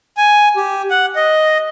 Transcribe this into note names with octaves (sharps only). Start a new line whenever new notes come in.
G#5
G4
F#5
D#5